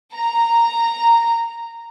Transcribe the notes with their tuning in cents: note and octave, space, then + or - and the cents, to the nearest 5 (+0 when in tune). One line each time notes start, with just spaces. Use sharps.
A#5 -10